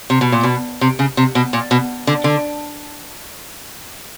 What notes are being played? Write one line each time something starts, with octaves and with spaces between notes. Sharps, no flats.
C3
B2
A#2
B2
C3
C#3
C3
B2
A#2
B2
D3
D3